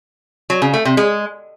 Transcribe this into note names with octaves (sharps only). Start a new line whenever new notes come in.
F#3
C#3
A3
C3
G#3